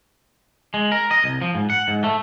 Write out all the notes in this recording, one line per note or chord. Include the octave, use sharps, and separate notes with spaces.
G#3
A#4
D#5
C2
F3
G#2
F#5
G#2
A3